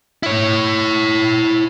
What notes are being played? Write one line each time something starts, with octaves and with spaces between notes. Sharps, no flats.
E4 C#5